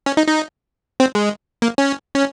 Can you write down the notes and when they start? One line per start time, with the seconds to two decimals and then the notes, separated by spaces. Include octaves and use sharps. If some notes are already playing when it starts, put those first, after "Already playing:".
0.06 C#4
0.17 D#4
0.28 D#4
1.00 C4
1.15 G#3
1.62 A#3
1.78 C#4
2.15 C#4